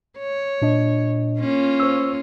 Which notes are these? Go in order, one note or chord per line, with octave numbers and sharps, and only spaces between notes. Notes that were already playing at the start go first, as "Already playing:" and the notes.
C#5
A#2 D4 D#5
A#3 C#4 F4
C5 C#6 E6